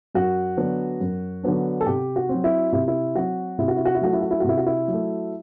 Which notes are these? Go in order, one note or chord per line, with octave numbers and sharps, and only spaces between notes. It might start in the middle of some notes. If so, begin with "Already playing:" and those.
F#2 F#4
D3 F#3 B3 D4
F#2
D3 F#3 B3 D4
A4
C3 G4
F#4
C4
F#3
E4
C3 E4
E4
F#3 C4 F#4
C3 E4
F#4
E4
F#4
E4
F#3 A3 F#4
E4
F#4
E4
F#4
C3 E4
F#4
E4
F#3 A3